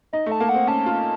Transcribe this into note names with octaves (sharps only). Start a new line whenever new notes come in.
D#4 D#5
A3
A5
A#3
F#5
C4
C#4 A5
F4